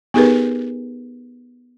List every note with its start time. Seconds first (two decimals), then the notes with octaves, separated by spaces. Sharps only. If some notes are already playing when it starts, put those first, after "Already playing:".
0.14 B3 D#4 G4 G#4 A#4 B4